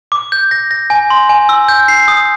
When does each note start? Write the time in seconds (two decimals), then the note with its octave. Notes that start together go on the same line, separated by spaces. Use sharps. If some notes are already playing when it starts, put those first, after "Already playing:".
0.12 D6
0.32 G6
0.51 A#6
0.71 A#6
0.90 G#5
1.10 C6
1.29 G#5
1.49 E6
1.68 G6
1.88 C7
2.08 D#6